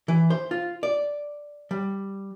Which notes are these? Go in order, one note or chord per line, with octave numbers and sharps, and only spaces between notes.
E3
C5
F4
D5
G3